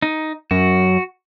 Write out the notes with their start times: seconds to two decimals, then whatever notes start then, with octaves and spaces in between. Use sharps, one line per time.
0.02 D#4
0.51 F#2 F#4